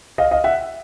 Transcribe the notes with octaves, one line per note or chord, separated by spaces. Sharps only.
D#5 F5
D#5 F5
E5 F#5